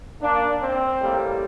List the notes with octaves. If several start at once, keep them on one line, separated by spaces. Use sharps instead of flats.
A#3 D4
C4
A2 G3 A#3